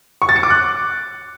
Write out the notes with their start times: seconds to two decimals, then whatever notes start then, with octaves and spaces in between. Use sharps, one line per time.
0.22 C#6
0.29 A6
0.36 C#7
0.43 D6
0.50 F#6